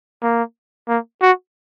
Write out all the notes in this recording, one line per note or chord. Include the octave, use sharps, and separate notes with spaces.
A#3
A#3
F#4